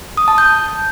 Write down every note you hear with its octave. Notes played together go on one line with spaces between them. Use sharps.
D#6
A5
G6